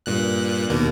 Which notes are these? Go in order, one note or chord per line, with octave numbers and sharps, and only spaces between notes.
G2 A#2 F#6
D#2 B2 A#3